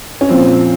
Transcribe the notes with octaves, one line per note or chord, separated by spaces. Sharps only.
C#4
A#2 F3 C4